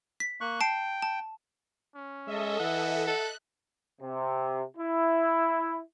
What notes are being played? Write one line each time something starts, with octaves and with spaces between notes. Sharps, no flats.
B6
A#3 C#6 F#6
G5 A5 C7 D7
A5
C#4
G#3 A4 D#5 E5
E3 F#5
A4 F#6
C3
E4